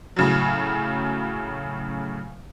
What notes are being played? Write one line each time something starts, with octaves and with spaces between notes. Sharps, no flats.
A2 C#3 F#3